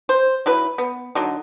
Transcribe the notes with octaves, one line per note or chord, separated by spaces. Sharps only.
C5
F#3 E4 B4
B3
D3 F#3 D#4